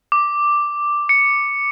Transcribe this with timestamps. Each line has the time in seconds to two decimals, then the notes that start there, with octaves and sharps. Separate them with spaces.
0.12 D6
1.09 C#7